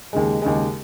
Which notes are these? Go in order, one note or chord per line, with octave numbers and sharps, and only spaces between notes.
D#2 C#3 G#3
D#2 C#3 G#3